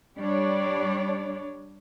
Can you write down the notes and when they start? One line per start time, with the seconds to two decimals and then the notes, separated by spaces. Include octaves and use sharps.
0.18 G3 D4 C#5 D5